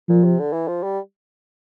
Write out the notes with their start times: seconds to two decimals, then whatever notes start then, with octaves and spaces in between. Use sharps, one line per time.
0.09 A#2 F3
0.24 C3
0.39 D3
0.53 E3
0.68 F3
0.83 G3